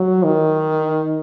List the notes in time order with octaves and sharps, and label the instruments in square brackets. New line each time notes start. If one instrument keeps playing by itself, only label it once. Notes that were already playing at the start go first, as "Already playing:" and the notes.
Already playing: [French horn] F#3
D#3